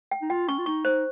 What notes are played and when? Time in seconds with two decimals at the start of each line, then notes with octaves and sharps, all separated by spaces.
0.11 G5
0.22 D#4
0.30 F4 G5
0.48 C#4 C#6
0.58 F4
0.66 D#4 C#6
0.85 D#4 C5